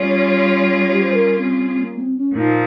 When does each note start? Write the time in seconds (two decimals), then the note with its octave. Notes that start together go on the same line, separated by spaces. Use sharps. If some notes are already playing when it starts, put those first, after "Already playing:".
Already playing: G3 C#4 F4 G#4 C#5
0.91 G4
1.03 C5
1.14 A#4
1.38 C4
1.63 C4
1.80 A#3
1.99 C4
2.17 C#4
2.34 A#2 F3 D#4